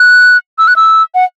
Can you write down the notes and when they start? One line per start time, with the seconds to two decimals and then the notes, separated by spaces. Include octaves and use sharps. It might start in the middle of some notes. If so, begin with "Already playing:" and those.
Already playing: F#6
0.58 E6
0.68 F#6
0.76 E6
1.15 F#5